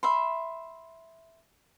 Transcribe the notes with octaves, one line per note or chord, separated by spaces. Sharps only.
E5 B5 C6